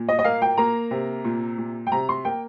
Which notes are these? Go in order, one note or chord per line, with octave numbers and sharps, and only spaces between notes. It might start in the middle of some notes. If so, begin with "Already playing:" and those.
Already playing: A#2
D#5
D#5
A#3 F5
G5
A#3 A#5
C3
A#2
A#2
G5
C3 A#5
C6
A#3 G5